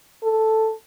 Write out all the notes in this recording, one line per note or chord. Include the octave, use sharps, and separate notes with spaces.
A4